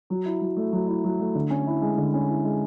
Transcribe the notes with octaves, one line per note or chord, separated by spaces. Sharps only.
F#3
E4
F#3
A3
F#3
E4
F#3
A3
D3
C#4
E4
G#3
D3
C#4
E4
G#3